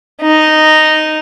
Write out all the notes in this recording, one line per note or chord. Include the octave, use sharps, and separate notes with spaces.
D#4